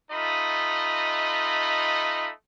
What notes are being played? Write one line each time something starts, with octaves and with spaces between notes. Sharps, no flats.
A3 D#4 F4 D#5 B5